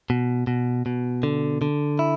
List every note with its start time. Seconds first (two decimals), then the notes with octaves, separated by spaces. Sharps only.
0.10 B2
0.47 B2
0.86 B2
1.23 D3
1.62 D3
1.99 E4